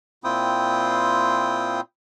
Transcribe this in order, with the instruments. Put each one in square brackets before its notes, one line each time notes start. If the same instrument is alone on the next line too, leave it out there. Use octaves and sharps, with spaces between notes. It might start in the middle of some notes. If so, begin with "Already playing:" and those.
[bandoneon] A#2 C4 E4 F4 G5 D#6